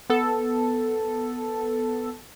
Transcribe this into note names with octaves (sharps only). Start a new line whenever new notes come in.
B3 A4